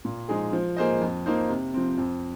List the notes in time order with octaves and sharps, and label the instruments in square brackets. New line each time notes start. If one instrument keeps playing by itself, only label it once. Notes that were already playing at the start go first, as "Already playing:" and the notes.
[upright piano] A#2
F3 G#3 D#4 G#4
F3
A#3 G#4 C5 D#5
F2
F3 A#3 D#4 C5
C3
F3 C4
F2